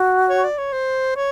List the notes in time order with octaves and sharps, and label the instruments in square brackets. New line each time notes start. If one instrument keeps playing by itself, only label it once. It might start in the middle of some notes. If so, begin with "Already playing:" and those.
Already playing: [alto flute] F#4
[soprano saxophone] C#5
D5
C#5
C5
C#5